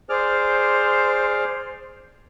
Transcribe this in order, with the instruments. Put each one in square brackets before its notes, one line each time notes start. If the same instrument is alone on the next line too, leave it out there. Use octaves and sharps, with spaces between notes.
[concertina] G#4 D5 F6 [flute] C5